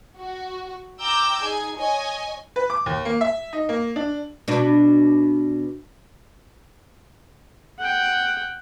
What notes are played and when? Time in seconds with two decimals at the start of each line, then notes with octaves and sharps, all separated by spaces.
0.17 F#4
1.01 G5 A#5 D6 E6 G6
1.41 D#4 G#4 G#5
1.77 C#5 D#5 G#5
2.56 B4
2.70 D6
2.86 D#2
3.05 A#3
3.21 E5
3.53 D#4
3.69 A#3
3.96 D4
4.48 B2 D4
7.79 F#5 G5